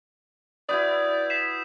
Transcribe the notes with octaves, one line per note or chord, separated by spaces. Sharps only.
E4 F#4 B4 D5 D#6 G6
B6 C7 E7